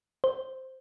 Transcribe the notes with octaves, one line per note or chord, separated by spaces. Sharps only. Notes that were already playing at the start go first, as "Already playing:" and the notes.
C5